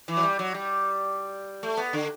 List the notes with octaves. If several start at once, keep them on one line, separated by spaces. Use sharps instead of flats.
E3
F#3
G3
F#3
G3
A3
B3
D3